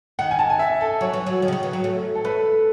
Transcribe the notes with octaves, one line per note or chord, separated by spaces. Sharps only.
D#3 F#5
G#5
A5
G#5
E5
A4
F#3 C#5
E3
F#3
D#3
C#3
D#3
E3
F#3
A3
A4
A3 B4